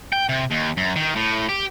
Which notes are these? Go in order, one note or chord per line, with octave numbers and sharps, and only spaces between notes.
G5
C3
D#2
F#2
D#3
A2
G4